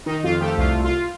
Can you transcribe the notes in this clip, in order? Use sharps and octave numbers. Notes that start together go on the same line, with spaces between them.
D#3 D#4
F2 F4
A3 G4
C2 F4
C2
F4